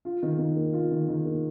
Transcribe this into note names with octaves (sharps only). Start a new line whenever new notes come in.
F4
D#3
D#3
A#3
F4
D#3
D#3
A#3